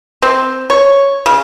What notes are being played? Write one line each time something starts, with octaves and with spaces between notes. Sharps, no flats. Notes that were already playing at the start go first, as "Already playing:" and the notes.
C4
C#5
C#3